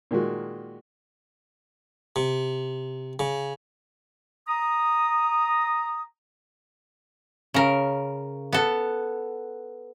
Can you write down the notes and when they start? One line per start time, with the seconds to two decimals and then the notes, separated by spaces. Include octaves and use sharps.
0.11 A#2 D#3 G#3 F#4
2.16 C3
3.19 C#3
4.48 A#5 D#6
7.54 C#3 A#4
8.53 B3 A4